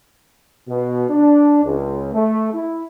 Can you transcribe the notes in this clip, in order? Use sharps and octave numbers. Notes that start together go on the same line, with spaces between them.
B2
D4
C#2
A3
E4